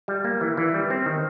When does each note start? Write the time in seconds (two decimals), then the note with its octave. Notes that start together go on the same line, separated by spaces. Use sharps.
0.08 G3
0.24 A#3
0.41 E3
0.57 E3
0.74 G3
0.90 C4
1.06 D#3